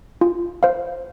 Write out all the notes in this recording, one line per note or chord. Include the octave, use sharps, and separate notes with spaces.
F4
C5 F5